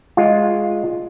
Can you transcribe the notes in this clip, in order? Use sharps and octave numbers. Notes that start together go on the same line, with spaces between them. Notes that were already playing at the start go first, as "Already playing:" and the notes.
G#3 F4